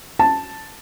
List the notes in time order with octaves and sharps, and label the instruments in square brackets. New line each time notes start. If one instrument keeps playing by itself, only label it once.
[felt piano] A5